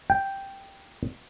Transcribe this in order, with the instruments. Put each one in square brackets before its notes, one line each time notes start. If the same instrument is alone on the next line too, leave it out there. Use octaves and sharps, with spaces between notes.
[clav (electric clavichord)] G5